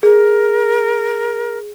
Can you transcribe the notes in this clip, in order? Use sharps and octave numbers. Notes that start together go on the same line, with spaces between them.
G#4 A#4